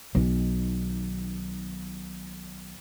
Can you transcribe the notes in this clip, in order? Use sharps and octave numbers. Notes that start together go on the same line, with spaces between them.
B1 D#3